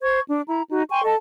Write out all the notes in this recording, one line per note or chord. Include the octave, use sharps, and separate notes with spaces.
C5 C#6 G#6
D4
E4 A#5
D#4 F#4
G5 G#5 C6 C#6
A4 D#5 A5